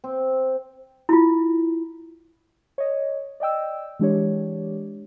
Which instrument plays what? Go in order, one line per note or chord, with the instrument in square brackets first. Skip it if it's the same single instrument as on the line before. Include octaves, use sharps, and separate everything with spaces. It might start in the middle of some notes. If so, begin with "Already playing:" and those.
[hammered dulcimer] C4
[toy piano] E4 F4
[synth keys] C#5 D#5
D5 D#5 G5 E6
E3 G#3 D4 G4 C#5